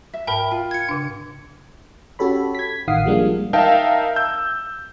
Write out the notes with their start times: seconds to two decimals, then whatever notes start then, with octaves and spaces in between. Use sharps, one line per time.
0.13 E5
0.27 G#2 A#4 G5 B5
0.52 F4
0.71 G#6 C#7
0.89 C#3 D4
2.19 C#4 F#4 G4 A4 C#5 B5
2.55 G#6 B6
2.88 A1 D#3 F5 F#5 D#6 C7
3.05 F3 G3 G#3 A#3 D4
3.53 D#4 A#4 E5 F5 G5 A5
4.16 E6 G6